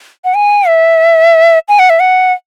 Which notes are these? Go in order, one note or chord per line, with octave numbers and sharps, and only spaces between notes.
F#5
G#5
E5
G#5
F#5
E5
F#5